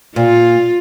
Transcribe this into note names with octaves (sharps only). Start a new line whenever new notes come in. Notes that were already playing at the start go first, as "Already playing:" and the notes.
A#2 F4